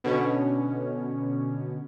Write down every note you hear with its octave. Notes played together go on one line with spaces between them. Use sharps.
B2 D3 C#4